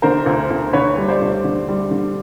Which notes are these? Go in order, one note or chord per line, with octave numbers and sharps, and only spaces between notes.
D3 A#4 C5
D2
D2
D3 B4 C#5
G3
C5 D5
D2
D3
G3
D3